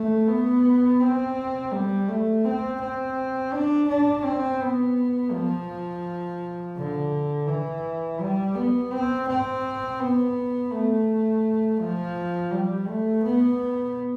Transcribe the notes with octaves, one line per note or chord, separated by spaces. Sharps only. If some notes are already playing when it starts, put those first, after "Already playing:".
Already playing: A3
B3
C4
G3
A3
C4
C4
D4
D4
C4
B3
F3
D3
E3
G3
B3
C4
C4
B3
A3
F3
G3
A3
B3